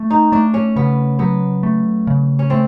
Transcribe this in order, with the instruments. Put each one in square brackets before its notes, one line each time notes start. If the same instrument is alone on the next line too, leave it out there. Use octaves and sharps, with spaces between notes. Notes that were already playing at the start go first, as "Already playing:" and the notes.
Already playing: [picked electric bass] A3
[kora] D#4
[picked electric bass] A3 [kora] D4
[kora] C#4
[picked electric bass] C#3 [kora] B3
[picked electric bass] F#3 [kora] B3
[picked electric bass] A3
C#3
[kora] C#4
[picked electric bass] A3 [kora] C4